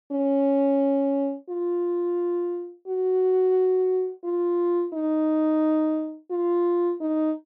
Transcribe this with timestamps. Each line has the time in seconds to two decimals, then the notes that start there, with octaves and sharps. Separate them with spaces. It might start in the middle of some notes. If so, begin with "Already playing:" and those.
0.12 C#4
1.49 F4
2.87 F#4
4.24 F4
4.93 D#4
6.31 F4
7.01 D#4